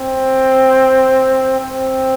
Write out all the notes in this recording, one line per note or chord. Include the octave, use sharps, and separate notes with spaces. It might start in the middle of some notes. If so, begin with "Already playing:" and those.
Already playing: C4
C4